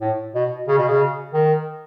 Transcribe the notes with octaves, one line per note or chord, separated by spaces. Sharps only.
A2
B2
C#3
B2
C#3
D#3